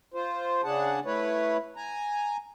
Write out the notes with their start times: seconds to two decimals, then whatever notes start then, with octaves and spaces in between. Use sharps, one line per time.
0.14 F4 C5
0.64 C#3 D4 G#4 F#5 A5
1.05 A3 E4 B4 C#5
1.77 G#5 A#5